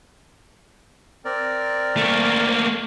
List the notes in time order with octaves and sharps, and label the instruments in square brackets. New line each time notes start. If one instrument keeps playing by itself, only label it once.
[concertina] C4 A#4 D5
[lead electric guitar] A3 A#3